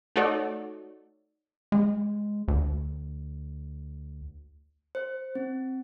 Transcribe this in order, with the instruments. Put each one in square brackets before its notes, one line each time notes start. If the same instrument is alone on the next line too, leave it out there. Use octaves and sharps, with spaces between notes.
[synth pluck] A3 D#4 F#4 A4 C#5 D5
[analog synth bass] G#3
D2
[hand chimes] C5
C4